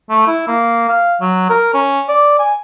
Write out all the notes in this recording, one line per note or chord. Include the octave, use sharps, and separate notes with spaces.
A3
E4
A#3
F5
F#3
A#4
C#4
D5
G#5